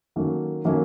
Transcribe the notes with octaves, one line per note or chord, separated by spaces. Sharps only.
D#3 F#3 A#3 C#4 A4
D#3 F#3 A#3 C#4 A4